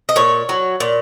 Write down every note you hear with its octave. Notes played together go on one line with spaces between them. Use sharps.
D#5
A#2 C#5
F#3
A#2